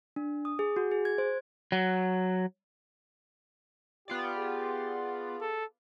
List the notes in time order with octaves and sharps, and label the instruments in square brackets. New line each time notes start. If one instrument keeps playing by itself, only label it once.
[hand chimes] D4
D#6
G#4
F#4
G#4
G#6
C5
[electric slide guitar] F#3
[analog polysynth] B3 F4 D5 [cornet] G4
[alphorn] G#4
[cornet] A4